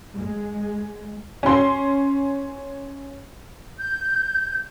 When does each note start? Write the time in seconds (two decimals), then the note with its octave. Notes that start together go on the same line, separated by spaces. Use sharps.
0.16 G#3
1.43 C#4 C6
3.77 G6